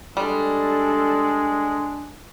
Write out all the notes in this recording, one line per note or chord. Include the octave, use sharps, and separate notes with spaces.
G3 G#3 D4 A4